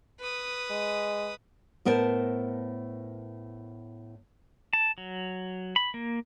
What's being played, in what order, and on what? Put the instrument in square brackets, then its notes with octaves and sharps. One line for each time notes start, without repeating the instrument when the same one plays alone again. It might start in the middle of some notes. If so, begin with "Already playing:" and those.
[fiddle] B4 D#6
[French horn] G#3
[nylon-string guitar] A2 B3 A#4 C5 A5
[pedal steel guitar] A5
F#3
B5
A#3